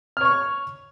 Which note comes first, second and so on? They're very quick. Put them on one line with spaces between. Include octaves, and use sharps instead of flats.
F6 C#5 C#6